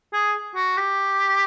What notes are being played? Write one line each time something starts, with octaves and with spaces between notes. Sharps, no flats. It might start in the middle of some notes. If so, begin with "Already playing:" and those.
G#4
F#4
G4